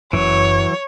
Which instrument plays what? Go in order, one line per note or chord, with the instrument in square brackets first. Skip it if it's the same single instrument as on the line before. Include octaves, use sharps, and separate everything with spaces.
[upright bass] F#1 [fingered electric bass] F#2 [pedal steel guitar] E3 F#3 [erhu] C#5